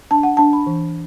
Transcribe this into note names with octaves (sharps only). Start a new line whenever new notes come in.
D4 A5
F#5
D4 A5
B5
E3